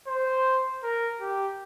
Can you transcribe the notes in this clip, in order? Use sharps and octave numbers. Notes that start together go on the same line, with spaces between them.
C5
A#4
G4